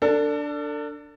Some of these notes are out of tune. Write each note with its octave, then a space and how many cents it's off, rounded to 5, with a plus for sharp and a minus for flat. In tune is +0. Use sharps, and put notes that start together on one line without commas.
D4 +0 A4 +35